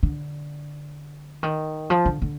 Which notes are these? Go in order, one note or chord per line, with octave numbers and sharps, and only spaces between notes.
D3
D#3
F3
D3
D3